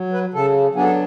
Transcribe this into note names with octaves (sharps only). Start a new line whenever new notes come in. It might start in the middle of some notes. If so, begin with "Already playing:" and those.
Already playing: F#3
B4
C#3 A4
F#3 B3 D4 G#4
A4